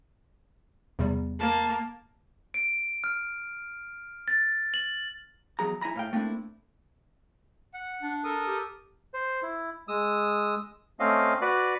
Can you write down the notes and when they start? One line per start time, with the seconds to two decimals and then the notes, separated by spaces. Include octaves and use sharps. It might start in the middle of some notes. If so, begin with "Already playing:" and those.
0.99 E2 C3 G3
1.39 A#3 A5
2.54 D7
3.04 F6
4.28 A6
4.74 F#7
5.59 E2 F#3 G#4 A#5
5.81 E4 E5 G#5 A#5 B5
5.96 A2 F5 G5
6.13 A3 A#3 C4 D4 E4
7.74 F#5
8.02 D4
8.24 A4 A#4 D#6
8.47 G4
9.14 C5
9.43 E4
9.88 G#3 D#6 E6
11.00 A3 C4 C#4 D#5 F5
11.41 F#4 B4 D5